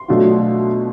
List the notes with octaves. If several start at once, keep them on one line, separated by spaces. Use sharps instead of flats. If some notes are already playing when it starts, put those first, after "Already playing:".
Already playing: C6
B2 F#3 A3 D4 F4